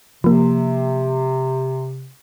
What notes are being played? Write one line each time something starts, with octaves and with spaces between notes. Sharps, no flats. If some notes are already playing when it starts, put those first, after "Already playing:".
C3 F3 A#3